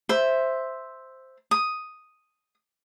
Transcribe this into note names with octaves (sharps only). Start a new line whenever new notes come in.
C5 E5
D#6